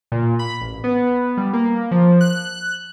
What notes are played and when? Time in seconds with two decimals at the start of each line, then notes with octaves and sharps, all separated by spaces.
0.12 A#2
0.39 B5
0.61 A1
0.84 B3
1.37 G3
1.53 A#3
1.91 F3
2.21 F#6